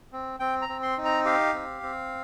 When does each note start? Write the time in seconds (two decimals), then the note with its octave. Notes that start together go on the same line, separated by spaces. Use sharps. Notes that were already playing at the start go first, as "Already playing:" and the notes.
0.12 C4
0.40 C4 G5
0.62 A#5
0.69 C4
0.83 C6
0.98 D#4
1.05 A#5
1.25 G4 F5
1.54 C4
1.83 C4